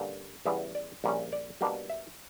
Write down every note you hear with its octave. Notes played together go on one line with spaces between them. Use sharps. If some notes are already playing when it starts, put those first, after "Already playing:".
Already playing: G2 D3 A#3 C#4
E2 C#3 G3 B3 E5
D5
A#1 A#2 G3 C#4
D5
B2 G3 A#3 D4
E5